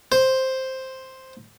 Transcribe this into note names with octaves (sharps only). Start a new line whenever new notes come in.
C5